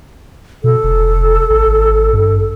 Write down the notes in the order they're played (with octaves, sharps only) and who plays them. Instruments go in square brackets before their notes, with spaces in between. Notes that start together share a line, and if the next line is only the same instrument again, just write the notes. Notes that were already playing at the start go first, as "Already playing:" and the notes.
[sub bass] B2 [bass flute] A4
[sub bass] F1
G#1
G2